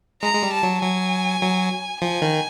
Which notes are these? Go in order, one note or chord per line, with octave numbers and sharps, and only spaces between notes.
G#3 A#5
G#3
G3
A5
F#3
F#3 G#5
F#3
F3 G#5
D#3